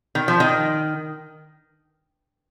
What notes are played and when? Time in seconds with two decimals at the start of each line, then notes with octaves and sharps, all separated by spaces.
0.15 D#3
0.28 F3
0.40 D#3